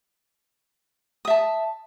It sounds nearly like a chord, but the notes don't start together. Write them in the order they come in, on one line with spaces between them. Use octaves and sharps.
D#6 E5 A5